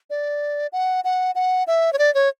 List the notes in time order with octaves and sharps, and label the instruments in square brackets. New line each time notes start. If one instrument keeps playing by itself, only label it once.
[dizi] D5
F#5
F#5
F#5
E5
C#5
D5
C#5